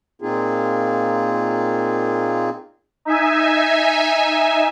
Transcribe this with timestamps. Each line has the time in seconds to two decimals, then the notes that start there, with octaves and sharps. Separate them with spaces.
0.22 A#2 A#3 C4 D#4 F4 G#4
3.05 D#4 E5 G#5